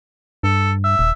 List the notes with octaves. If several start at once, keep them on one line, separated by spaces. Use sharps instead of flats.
G2 A4
E5
D#1